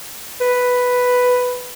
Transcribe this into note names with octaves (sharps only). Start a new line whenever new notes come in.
B4